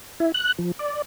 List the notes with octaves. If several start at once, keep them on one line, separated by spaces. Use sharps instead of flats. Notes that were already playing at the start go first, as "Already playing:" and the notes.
E4
F#6
F3
D5